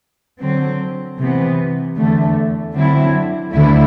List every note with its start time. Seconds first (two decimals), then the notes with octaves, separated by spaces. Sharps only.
0.41 D3 F#3 C4
1.19 C3 E3 B3
1.97 E2 D3 A3
2.75 D3 F#3 C4 E4
3.53 D2 D3 A3 E4